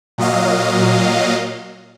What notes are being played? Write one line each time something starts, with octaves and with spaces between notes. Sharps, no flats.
A#2 F#3 D#5 F5